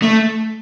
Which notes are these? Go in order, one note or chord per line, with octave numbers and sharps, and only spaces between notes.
A3